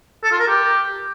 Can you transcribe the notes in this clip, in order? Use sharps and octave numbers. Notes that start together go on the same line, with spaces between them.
A4
F4
A#4
G4